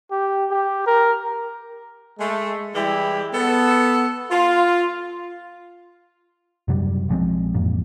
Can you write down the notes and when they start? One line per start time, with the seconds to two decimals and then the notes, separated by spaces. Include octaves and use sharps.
0.11 G4
0.51 G4
0.87 A#4
2.19 G#3 A3
2.74 E3 G3 G#3 E4 G4
3.34 B3 A4
4.31 F4
6.68 F#2 C3 F#3 G3
7.09 A#1 F3 G#3 C4
7.54 A1 F2 A#2